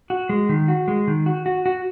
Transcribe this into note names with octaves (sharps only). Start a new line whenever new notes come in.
F#4
G#3
D#3
F#4
G#3
D#3
F#4
F#4
F#4